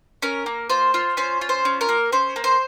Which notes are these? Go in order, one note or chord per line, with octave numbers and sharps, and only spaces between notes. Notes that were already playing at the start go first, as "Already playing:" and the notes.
C#4 A#4
A#3
F4 C5
F4
C#4 C5
F4
C5
C#4
A#4
A#3
C#4 C5
A#3
C5